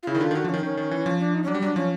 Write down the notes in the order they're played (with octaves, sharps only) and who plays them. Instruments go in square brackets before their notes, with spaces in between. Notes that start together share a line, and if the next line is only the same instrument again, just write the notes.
[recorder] F4
[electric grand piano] C#3 [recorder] E4
[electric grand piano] D#3
[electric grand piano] D3 [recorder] F4
[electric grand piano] D#3
[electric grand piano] D3 [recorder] F#4
[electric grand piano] F3
[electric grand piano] D#3 [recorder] C#4
[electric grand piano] D#3 [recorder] C#4
[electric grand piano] D#3
E3
F3
[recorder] D4
D#4
C#4
[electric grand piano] F#3 [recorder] D4
[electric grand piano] G3
[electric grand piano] F#3 [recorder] D4
[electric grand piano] F3 [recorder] C#4